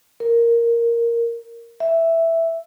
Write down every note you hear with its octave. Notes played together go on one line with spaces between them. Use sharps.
A#4
E5